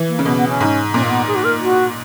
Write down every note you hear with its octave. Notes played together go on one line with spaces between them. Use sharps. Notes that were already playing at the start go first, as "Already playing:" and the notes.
Already playing: E3
A#3
C#3
B2 B3
B3
C#4
G#2
A#2 C#4
A#3
B3
G#4
F#4
A#4
F#4